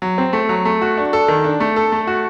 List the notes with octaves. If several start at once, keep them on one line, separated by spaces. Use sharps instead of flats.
F#3
C4
A3
F#3
A3
F#4
D4
A4
D#3
D4
A3
A4
A3
F#4